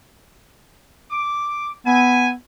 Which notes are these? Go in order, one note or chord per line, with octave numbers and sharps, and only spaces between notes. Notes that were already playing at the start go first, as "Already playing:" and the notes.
D6
B3 E5 G#5